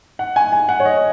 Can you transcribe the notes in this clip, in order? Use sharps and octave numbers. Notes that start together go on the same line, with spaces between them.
F#5
G#5
G#5
F#5
C#5
D#5